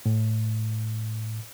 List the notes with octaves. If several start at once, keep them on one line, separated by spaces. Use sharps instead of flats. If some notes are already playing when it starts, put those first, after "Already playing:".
A2